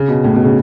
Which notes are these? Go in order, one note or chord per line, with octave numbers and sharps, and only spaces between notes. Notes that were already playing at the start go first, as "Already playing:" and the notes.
Already playing: C#3
B2
A2
B2
C#3